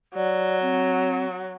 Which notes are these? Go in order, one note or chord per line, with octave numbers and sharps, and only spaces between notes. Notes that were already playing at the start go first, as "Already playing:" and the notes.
F#3 D5
C4